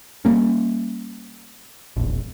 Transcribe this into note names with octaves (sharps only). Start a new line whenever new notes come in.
G3 A#3 C#4
E1 A#1